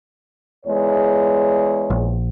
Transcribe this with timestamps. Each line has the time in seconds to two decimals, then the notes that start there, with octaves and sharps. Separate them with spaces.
0.66 E2 G#3 C#5
1.90 A#1